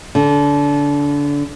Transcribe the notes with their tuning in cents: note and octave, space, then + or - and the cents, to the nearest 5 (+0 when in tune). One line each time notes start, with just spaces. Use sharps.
D3 -25